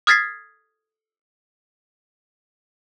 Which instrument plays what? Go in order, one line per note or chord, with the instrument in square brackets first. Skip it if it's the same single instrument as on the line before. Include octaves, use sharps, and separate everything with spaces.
[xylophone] D#6 F6 G#6 A6 B6 C7